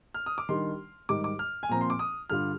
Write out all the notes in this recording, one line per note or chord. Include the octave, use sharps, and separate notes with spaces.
F6
D#6
D6
D#3 G3 D4 C6
G#2 D#3 G3 D6
D6
F6
G#5
A#2 F3 C4 A#5
C6
D6
D#6
G2 D3 G3 D4 F4 F6